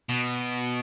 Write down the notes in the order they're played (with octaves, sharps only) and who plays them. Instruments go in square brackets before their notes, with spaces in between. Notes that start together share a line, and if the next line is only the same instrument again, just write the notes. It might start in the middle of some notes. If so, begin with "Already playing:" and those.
[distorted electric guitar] B2